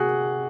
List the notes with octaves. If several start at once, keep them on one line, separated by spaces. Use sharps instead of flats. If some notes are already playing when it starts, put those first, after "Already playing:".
Already playing: C3 F#4 G#4